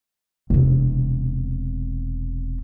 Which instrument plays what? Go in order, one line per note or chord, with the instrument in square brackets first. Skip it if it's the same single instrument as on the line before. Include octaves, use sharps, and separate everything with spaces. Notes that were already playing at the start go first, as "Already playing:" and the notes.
[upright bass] E1 C3